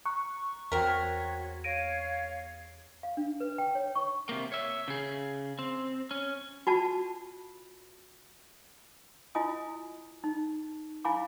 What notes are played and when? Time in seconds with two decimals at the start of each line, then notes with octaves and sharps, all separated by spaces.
0.06 A#5 C#6 F#6
0.72 E2 C4 F#4 A#4 C#5 G5 B6
1.64 C#5 F5 A#6 D7 D#7
3.03 F5
3.17 D4
3.40 B4
3.58 G5
3.75 C#5
3.95 C#6
4.29 C3 A#3
4.52 C#5 E5
4.88 C#3 G#4
5.59 C4
6.11 C#4
6.67 F4 F#4 A5
9.35 E4 F4 D#5 G#5 D#6
10.24 D#4
11.05 E4 F5 G#5 B5 D6